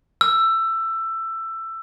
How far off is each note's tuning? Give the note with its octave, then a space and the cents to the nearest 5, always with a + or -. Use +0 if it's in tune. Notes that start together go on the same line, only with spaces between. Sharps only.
E6 +15